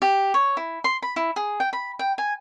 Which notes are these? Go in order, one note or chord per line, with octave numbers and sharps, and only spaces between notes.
G4
C#5
E4
C6
B5
E4
G#4
G5
B5
G5
G#5